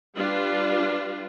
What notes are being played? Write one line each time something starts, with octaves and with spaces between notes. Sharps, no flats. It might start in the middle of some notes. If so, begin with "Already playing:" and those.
G3 D4 F4 B4